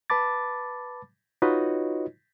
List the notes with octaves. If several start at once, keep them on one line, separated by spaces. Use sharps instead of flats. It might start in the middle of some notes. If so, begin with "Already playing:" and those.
B4 A5 B5 D6 A6
D#4 F4 F#4 B4 C#5 D#5